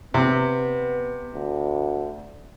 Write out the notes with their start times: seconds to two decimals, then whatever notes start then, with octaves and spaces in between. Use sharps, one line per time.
0.14 C3 B3
1.34 D2